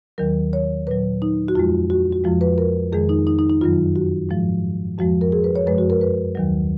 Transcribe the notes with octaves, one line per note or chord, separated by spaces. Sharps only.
D#2 D#3 F#3 A#4
C#5
A#2 F#3 B4
D#4
F#4
F2 F3 G#3 F4
F#4
F#4
F2 F3 G#3 F4
B4
A#4
F2 D#3 G#3 G#4
D#4
D#4
D#4
D#4
F#2 D#3 F#3 F4
F#4
G#2 F3 G#3
F2 F3 G#3 F#4
A#4
G#4
B4
C#5
F#2 F3 G#3 B4
F#4
A#4
B4
D#2 D#3 F#3